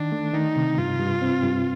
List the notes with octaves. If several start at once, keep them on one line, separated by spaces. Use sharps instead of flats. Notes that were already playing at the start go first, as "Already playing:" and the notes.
Already playing: D#3 D4
A3
D#3 D#4
C3
G2 F4
G2
C4
G2